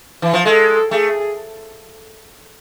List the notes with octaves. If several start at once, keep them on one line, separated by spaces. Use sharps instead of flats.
E3
F3
G#3 A4
A3 G#4